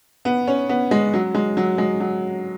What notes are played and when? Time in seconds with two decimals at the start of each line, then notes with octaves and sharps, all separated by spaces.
0.25 B3
0.47 C#4
0.69 B3
0.91 G#3
1.14 F#3
1.35 G#3
1.57 F#3
1.78 G#3
2.00 F#3